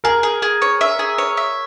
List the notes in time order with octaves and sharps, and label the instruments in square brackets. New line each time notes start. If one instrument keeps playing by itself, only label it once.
[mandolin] G#4 [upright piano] A#4
[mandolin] G#4
G#4
C#5
E5
G#4
C#5
E5